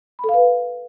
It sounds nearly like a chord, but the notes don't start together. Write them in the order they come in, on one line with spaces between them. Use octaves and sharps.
B5 A4 F5 B4